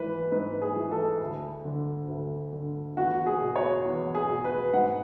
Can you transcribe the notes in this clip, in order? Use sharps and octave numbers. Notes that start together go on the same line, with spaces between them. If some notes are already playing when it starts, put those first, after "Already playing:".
Already playing: G#2 E3 B4
G#2 B4
G#4
E3
A4
D2
D3
D2
D3
E2 F#4
G#4
B2
C#5
E2
G#4
B2
B4
G#2 F#5